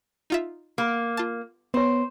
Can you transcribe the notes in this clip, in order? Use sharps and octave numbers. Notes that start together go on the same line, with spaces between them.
D#4 F4 E5
A#3
F4 A5
B3 C5 C#5